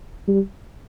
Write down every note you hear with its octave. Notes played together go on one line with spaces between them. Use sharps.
G3